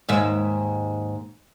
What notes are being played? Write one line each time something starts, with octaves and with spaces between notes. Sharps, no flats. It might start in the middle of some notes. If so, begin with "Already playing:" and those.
D#2 G#2 E5